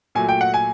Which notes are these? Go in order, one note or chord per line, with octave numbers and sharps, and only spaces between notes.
A#2 F#3 A3 G#5
G5
F#5
G#5